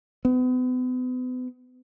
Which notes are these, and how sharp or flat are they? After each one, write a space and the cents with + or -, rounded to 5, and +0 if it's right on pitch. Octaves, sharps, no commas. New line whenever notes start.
B3 +40